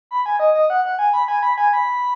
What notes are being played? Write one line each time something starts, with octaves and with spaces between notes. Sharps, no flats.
B5
G#5
D#5
D#5
F#5
F#5
G#5
B5
G#5
B5
G#5
B5